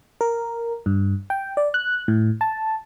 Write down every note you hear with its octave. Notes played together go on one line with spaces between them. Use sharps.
A#4
G2
G5
D5
F#6
A2
A5